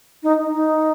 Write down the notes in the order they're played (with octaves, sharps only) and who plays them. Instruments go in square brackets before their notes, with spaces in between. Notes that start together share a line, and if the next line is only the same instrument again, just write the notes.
[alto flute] D#4
D#4